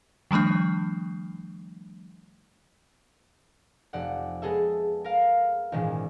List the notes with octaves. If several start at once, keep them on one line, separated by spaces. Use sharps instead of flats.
D#3 F3 G3 A3 D4
F1 D5 F#5
G#3 B3 G#4 A4 E5
A#4 F5
G#1 A#2 D#3 E3 D4